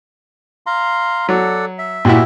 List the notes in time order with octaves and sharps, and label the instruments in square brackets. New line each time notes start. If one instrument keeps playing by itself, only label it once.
[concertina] F5 A#5 C6
[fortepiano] F#3 [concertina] A4 D5 F#5
[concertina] E5
[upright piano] A#2 [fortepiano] E4 F#4 G4